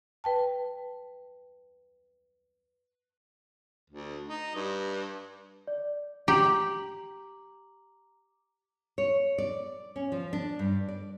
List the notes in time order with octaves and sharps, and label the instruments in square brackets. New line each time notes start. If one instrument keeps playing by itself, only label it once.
[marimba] B4 G5 A5
[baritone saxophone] D2
D#4
G2
[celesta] D5
[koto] G4 [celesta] A#5 D6 F#7
[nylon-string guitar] C#5
D5
C#4
F3
D4
G2
D5